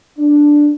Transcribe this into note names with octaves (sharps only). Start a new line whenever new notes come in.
D4